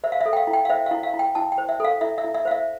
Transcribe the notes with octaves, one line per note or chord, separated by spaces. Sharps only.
C5 E5
F5
A4 E5
G5
F5
E4
G5
F5
C5 E5
F5
E4
F5
E4
G5
E4 A5
G5
C5
E5
A4 F5
E4 E5
E5
E4
E5
C5 F5
E5